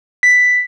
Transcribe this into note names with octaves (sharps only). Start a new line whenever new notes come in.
B6